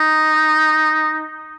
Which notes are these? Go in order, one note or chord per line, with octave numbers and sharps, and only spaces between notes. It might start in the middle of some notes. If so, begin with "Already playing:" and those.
Already playing: D#4